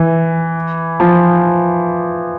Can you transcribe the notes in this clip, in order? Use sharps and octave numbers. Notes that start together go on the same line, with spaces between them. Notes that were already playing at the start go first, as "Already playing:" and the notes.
Already playing: E3
F3